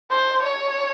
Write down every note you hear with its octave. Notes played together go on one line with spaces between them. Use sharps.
C5
C#5